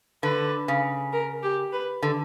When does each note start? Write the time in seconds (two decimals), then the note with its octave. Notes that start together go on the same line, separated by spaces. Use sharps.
0.23 D3 B4
0.68 C#3
1.13 A#4
1.43 G4
1.73 B4
2.03 D3